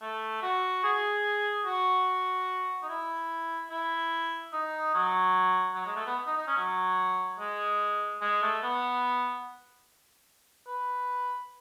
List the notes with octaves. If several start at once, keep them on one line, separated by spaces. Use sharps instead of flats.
A3
F#4
G#4
F#4
D#4
E4
E4
D#4
F#3
F#3
G#3
A3
B3
D#4
D#4
C#4
F#3
G#3
G#3
A3
B3
B4